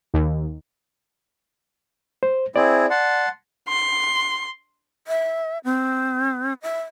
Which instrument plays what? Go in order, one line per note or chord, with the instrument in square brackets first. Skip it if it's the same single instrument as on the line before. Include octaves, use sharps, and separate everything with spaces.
[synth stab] D#2
[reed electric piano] C5
[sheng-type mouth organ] C4 E4 G#4 [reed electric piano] D5
[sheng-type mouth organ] F#5 A5 C6
[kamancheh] C6
[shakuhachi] E5
C4
E5